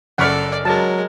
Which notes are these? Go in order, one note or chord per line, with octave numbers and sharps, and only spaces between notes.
F#1 A4 D5 F#5 B5 C#6 F6
F#3 G#3 A#4 A5